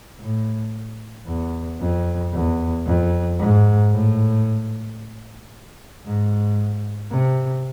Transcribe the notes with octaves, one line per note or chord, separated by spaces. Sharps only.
A2
E2
F2
E2
F2
G#2
A2
G#2
C3